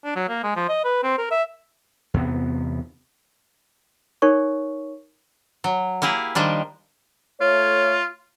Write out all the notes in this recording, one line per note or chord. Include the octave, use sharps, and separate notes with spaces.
D4
F#3
A#3
G#3
F3
D#5
B4
C4
A#4
E5
E2 C3 B3
D#4 A#4 C#5 C#6
F#3
A#3 E4 G4 G#4
D#3 F3 G3 D4
A3 F4 C#5